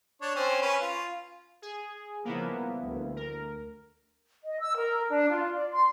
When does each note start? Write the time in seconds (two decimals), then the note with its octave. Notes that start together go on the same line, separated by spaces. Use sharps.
0.22 D4 C#5
0.36 C4 C#4 C5
0.62 C#4 B4
0.81 F4
1.62 G#4
2.25 C#3 F3 G3 A#3 B3 E4
2.81 D2
3.16 A#4
4.44 D#5
4.61 E6
4.77 A#4
5.10 D4
5.30 F4
5.55 D5
5.72 C6